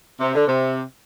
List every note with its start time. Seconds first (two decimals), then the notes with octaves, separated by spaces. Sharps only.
0.20 C3
0.34 D3
0.47 C3